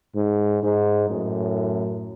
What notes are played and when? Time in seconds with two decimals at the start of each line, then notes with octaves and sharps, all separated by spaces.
0.15 G#2
0.62 G#2
1.09 F#2 A2